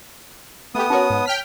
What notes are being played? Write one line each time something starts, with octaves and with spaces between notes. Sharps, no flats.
A3 B3 G4 D#6
C#4 F#4 A#4 C#5 A5
G#2
G5 F6 B6